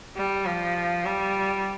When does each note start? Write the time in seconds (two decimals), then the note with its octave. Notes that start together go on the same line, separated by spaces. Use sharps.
0.16 G3
0.46 F3
1.06 G3